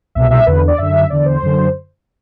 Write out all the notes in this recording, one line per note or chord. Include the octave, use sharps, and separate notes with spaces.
C2 B2 E5
E5
E2 D3 B4
D5
F#2 D3 E5
E2 D3 D5
C5
F#2 D3